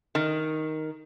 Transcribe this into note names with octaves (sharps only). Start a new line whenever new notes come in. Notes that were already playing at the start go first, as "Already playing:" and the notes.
D#3